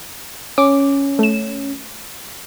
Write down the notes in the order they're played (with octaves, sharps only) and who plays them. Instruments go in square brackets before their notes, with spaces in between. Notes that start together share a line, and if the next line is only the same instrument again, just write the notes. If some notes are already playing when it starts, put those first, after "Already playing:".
[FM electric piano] C#4 [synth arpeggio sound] D6
[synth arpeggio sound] A3 E7